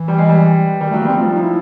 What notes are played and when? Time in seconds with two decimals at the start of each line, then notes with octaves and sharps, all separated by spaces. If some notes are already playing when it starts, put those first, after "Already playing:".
Already playing: E3
0.08 G3
0.18 G#3
0.29 G3
0.81 D#3 G3
0.90 F#3 A3
1.00 A#3
1.05 G3 C4
1.17 F3 A3
1.35 D#4
1.42 E4